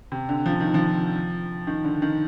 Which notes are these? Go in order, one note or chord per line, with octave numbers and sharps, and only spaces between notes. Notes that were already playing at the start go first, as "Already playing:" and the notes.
C3
D3
F3
D#3
F3
D#3
D3
D#3